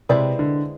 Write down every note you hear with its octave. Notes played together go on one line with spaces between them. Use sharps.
C3 G#3 C4 E4 B4 D5
D3